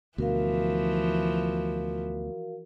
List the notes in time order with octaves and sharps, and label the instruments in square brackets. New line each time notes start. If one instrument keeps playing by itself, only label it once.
[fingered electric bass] D2 B2 [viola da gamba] E3 F3 [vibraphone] F#4 A#4 F5